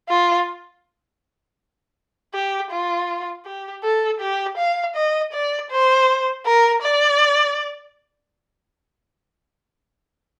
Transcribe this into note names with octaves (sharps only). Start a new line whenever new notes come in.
F4
G4
F4
G4
A4
G4
F5
D#5
D5
C5
A#4
D5